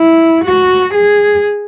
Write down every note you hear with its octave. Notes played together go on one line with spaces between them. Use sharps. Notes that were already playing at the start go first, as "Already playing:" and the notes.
Already playing: E4
F#4
G#4